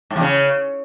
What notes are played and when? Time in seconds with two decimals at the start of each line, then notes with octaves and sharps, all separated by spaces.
0.10 G#2
0.16 E2
0.21 C#3